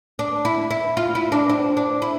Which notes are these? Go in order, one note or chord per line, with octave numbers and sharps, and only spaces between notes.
D4
E4
E4
F4
E4
D4
C4
D4
E4